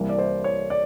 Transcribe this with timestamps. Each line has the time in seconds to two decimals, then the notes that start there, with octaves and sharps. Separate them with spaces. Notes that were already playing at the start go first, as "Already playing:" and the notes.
Already playing: C2 C3 E3 G3 A#3
0.09 D5
0.19 C5
0.44 C#5
0.70 D5